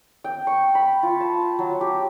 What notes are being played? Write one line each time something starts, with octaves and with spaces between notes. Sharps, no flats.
G5
C#6
B5
F4
A5
F#3
G4